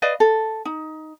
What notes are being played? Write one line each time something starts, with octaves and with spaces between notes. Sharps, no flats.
B4 D5 D#5 F5
A4
D#4